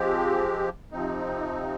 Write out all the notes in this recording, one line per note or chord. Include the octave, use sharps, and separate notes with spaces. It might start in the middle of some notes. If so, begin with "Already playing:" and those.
Already playing: F3 G#3 C4 G4
C3 F3 C4 D#4